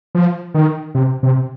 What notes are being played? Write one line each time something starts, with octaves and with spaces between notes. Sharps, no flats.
F3
D#3
C3
C3